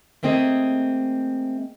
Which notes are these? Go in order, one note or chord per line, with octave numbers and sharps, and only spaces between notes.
A3 A#3 C4 G#4 D#5 E5